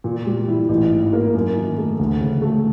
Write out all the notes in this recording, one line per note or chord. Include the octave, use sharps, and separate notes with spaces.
A#2
G3
E4
A1
G#2
A#3
F#2
D#3
A3
D2
C#3
A3